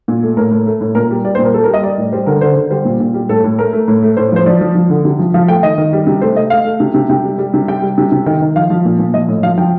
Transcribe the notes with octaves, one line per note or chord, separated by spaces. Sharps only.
A#2
A3
A2 A#4
A2
A3
A2
A#2 A#4
G3
G3 D5
C5
A#2
A#4
G3 A4
A#4
G3
D#5
G3 D5
A2
G3 C5
D3 A#4
D3 C5
D3
G3 C5
A#2
A#2
G3
A2 A4
A2
A3 A#4
A3
A2
A3
A2 C5
F3 C5
F3 D5
F3
F3
D3
C3
F3
F3 F5
A3 G5
D#3 D#5
D#3
G3
C3
A3 C5
A3 D#5
A3 F5
A3
C3
C3
C3 G5
G3
G3
C3
G3 G5
G3
C3
C3
D#3 G5
D#3
F3 F5
F3
A#2
A#2
F3 D#5
A2
F3 F5
F3 G5